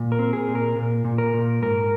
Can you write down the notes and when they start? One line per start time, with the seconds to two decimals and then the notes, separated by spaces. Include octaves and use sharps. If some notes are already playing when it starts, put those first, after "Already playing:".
Already playing: A#2
0.12 A#4
0.19 C4
0.33 G#4
0.48 A#2
0.55 A#4
0.76 A#2
1.05 A#2
1.18 A#4
1.34 A#2
1.62 G#2 A#4